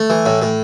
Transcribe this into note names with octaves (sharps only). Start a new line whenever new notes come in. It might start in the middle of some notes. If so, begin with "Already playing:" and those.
Already playing: A3
E3
A2
A2